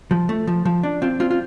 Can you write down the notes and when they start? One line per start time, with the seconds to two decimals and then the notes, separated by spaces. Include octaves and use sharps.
0.11 F3
0.29 A3
0.47 F3
0.65 F3
0.83 D4
1.02 C4 F4
1.20 C4 F4
1.31 F4